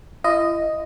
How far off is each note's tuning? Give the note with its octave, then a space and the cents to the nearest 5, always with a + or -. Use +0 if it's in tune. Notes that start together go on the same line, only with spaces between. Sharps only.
E4 +40 D#5 +0